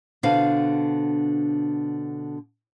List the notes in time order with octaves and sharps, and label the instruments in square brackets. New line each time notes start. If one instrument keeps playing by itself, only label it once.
[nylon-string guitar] B2 D3 D4 B4 C5 F5